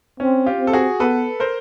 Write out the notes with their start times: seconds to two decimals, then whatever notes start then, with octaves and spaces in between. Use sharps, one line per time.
0.20 C4 C#4
0.46 F4 G4
0.59 C4
0.67 A4
0.73 F#4 G#4
1.00 B3 A4 B4
1.40 A#4 C5